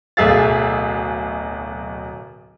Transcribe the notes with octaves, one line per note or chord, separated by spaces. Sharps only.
D1 B1 G#4 E5 F5 A6